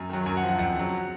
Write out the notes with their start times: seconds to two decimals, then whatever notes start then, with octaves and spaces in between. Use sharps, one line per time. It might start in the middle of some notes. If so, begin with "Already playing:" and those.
Already playing: F#2 G#5
0.09 D#3 F#3
0.26 F#2 G#5
0.37 F#5
0.43 F3
0.48 F#5
0.59 F2 F#5
0.75 C#3 F#3